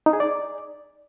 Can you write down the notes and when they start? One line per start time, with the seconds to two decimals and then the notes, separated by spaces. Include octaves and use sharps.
0.06 D#4
0.13 G#4
0.20 D5